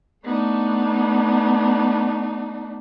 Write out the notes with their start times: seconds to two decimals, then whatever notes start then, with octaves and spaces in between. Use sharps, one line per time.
0.25 A3 B3 D4 D#4